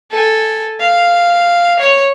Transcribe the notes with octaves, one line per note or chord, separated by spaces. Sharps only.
A4 G#5
F5
C#5